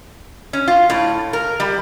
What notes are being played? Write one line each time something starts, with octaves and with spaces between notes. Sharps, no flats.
C#4
F4
A2
A#4
G3